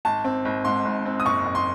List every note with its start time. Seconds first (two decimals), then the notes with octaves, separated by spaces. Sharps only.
0.05 G#1 A5
0.25 C4
0.45 G#1
0.65 G#2 C6
0.85 G#1
1.06 C4
1.20 D#6
1.25 F#1 C#6
1.46 F#1
1.55 C6